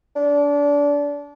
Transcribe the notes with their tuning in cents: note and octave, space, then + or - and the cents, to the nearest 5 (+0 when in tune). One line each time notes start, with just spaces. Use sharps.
D4 -25